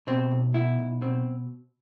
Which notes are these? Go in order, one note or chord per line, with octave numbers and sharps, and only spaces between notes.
B2 C4
B1
B2 E4
B1
B2 C4